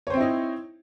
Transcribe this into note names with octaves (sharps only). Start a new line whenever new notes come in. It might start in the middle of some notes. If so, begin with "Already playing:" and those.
C4 D#4 E4 C5 C#5